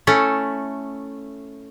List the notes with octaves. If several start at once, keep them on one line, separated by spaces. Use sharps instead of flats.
A3 C#4 E4 A4